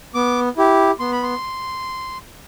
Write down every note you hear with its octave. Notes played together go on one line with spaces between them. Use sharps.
B3 D6
E4 G4
B3 C6
B5
C6